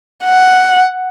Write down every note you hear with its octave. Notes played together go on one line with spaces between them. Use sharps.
F#5